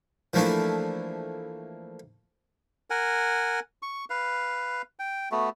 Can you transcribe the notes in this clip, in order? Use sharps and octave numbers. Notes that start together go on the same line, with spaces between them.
E3 F3 A3 A#3 D4 E4
A#4 F#5 G#5
C#6
B4 F5
G5
A3 B3 F#4